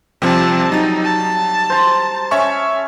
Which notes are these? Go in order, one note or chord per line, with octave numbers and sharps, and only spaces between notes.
C3 F3 G3 C4 A5
F#3 D#4 A6
A5
C5 A#5
C#4 C#5 E5 C#6